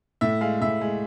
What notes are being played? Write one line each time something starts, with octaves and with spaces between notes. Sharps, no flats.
A2 E5
G#3 F5
A2 E5
G#3